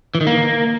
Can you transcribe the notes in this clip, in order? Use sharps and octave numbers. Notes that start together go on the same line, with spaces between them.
E3
D#3
A#3